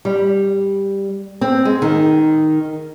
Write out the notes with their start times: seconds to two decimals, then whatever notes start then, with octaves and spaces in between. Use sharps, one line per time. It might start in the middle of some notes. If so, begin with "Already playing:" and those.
0.05 G3
1.41 C4
1.65 G#3
1.82 D#3